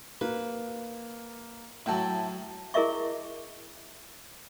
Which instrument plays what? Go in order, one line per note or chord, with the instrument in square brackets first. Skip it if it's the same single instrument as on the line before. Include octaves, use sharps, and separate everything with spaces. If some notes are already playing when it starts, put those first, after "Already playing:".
[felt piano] A#3 [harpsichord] B4
[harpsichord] A2 F#3 [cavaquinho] E4 G5 A5
[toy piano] E4 G#4 A#4 D#5 E5 C#6